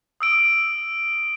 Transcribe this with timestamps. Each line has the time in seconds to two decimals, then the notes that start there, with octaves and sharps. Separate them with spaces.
0.21 D#6 E6 D7